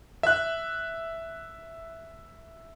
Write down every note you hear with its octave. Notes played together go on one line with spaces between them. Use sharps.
E5 F#6